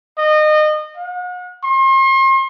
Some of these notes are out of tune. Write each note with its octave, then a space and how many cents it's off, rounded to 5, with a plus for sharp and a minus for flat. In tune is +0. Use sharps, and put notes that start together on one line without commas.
D#5 -30
F#5 -40
C6 +40